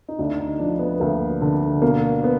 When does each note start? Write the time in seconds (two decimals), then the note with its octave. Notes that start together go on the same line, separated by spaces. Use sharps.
0.08 D#4
0.18 D2 D4
0.38 D#4
0.59 F3 D4
0.79 B3
1.00 D2 A#3
1.41 D3
1.82 B2 A#3
2.24 B3